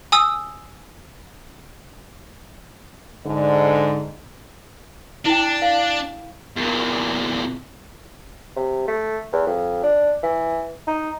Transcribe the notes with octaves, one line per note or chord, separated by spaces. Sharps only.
G#5 D#6 E6
G#2 D3
D4 E4 G5
F5
E2 A#2
C3
A3
E2
F2
D4
E3
D#4